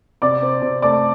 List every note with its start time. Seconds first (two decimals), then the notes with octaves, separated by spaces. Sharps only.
0.22 C3 D5 D6
0.42 C4
0.62 C3
0.82 A3 D5 D6